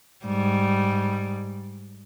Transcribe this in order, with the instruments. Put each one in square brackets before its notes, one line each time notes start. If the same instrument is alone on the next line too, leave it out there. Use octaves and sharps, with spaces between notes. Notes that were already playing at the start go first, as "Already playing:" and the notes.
[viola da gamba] G#2 G3